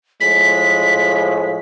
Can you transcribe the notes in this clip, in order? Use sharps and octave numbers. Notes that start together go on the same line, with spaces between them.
A2 F3 G#3 B6